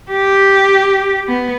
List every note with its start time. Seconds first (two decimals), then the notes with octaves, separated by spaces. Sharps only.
0.12 G4
1.28 B3